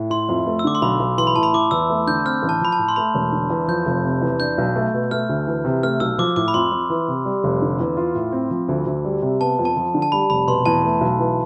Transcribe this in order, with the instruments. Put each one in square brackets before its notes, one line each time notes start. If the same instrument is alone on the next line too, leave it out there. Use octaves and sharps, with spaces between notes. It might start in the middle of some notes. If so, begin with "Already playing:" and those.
Already playing: [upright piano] A2
[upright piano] E4 [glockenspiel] C6
[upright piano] F2
A3
[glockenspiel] E6
[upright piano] D3 [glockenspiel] D6
[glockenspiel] C6
[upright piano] B1 [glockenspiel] B5
[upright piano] B1
[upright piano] E3 [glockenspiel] C6
[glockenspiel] B5
[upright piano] A2 [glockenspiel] A5
[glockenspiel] B5
[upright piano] E4 [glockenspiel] D6
[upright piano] E2 [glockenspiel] E6
[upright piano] A3
[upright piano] D3 [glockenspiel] G6
[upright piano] C4 [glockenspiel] F6
[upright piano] A1
[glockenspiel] A5
[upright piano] F3 [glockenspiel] B5
[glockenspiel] A5
[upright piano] A2
[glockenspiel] C6
[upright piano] A3 [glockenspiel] B5
[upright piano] E1
D3
E2
[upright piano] F3 [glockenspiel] G6
[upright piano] F1
C3
E2
[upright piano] D4 [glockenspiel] G6
[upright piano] B1
A3
B2
[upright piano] A3 [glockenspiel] F6
[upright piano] D2
E3
C3
[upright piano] A3 [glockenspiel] F6
[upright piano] B1 [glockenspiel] E6
[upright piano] F3 [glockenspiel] D6
[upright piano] A2 [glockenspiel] D6
[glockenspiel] B5
[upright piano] F2 [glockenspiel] C6
[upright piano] F2
E3
C3
G3
F1
D3
E2
F4
A2
C4
F3
D2
D2
G3
C3
[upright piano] B3 [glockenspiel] A5
[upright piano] F2
[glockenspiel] A5
[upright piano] F3
D3
[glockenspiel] A5
[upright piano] G3 [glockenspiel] B5
[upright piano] F1 [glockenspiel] B5
[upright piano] B2 [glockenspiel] C6
[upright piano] E2 [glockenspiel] A5
[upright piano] A3
B1
E3